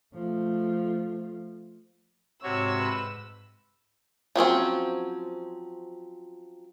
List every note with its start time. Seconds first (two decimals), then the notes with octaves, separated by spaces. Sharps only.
0.14 F3 A3
2.43 G#2 C3 F#4 C#5 E6
2.80 B4
4.36 F3 F#3 C4 C#4